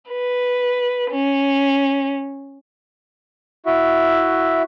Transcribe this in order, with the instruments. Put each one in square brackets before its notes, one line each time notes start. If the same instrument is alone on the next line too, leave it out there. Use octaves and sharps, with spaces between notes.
[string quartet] B4
C#4
[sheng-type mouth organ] E4 F#4 E5